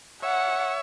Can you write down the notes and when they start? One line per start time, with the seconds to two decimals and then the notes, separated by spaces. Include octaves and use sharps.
0.22 C#5 E5 F#5